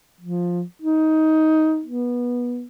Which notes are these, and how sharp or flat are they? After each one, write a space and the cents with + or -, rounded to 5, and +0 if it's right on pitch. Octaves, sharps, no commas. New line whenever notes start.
F3 +10
D#4 +15
B3 -20